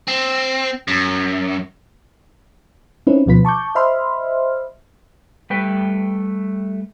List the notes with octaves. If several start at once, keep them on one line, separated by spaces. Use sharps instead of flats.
C4
F#2
C4 C#4 D#4 E4 B4
D2 B2 F3 F4 B4 B6
A5 C#6 D6 G6
C5 D#5 E5 B5 C6 F6
G3 A3 B4 G5